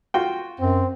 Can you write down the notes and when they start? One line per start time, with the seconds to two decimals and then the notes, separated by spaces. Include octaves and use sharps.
0.14 F4 F#4 G5
0.60 F#2 C4